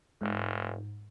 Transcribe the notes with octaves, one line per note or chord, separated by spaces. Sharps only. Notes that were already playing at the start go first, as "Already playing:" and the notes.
F1 G#2